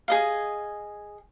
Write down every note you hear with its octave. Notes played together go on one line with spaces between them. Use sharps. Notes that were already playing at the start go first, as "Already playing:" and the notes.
G#4 D#5 F5